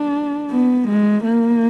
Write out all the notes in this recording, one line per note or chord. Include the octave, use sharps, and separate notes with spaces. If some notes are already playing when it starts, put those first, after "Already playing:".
Already playing: D4
B3
G#3
A#3